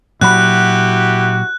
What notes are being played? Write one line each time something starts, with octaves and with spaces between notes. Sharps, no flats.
A#2 F#3 E4 F#4 G4 B5 F#6